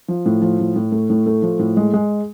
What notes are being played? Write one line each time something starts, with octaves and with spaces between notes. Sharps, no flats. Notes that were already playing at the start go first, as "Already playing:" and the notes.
F3
A2
F3
A2
A2
A3
A2
A3
F3
A2
G#3
G#3